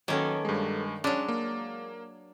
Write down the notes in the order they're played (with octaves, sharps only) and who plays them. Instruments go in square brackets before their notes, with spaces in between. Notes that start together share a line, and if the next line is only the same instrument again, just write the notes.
[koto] D#3 C#4 [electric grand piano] F#3 [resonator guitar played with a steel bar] A#3 B3 A4
[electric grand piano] G2 G#3
[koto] F#3 D4 [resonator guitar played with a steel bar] G#3 [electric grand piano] C#4
[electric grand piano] A#3